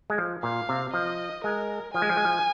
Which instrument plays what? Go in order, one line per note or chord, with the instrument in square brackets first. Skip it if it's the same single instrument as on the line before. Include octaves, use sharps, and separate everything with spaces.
[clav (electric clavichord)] G#3
F3
[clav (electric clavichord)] A#2 [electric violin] F5
[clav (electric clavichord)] C3
[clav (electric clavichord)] F3 [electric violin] D#5
[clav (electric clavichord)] G#3 [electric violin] A#4
[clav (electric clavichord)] F3 [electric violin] G#5
[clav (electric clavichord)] G#3
F3
G#3
F3